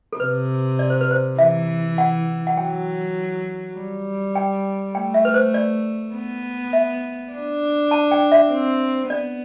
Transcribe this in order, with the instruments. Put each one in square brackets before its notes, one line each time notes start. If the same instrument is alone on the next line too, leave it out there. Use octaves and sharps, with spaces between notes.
[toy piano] A4
[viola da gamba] C3 [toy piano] B4
[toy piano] D5
C5
B4
C5
[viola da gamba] E3 [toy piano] E5
[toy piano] F#5
F#5
[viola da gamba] F#3 [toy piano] G5
[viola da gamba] G3
[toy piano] G5
[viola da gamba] A3 [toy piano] G5
[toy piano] E5
B4
C5
D5
[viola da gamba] B3
[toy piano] E5
[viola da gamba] D4
[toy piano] A5
G5
E5
[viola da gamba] C4
[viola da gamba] B3 [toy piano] D5